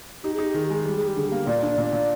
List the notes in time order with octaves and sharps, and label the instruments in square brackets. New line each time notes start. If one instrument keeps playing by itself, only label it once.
[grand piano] D#4 [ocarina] G4
[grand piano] D#4 [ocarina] G#4
[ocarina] G4
[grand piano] D#3 [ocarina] G#4
[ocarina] G4
[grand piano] G#3
[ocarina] G#4
[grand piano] G3 [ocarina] G4
[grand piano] G3 [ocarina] G#4
[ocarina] G4
[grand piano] D3 [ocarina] G#4
[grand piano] A#3 [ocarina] G4
[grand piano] A#2 [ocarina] D5
[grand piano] D4
A#2
A#2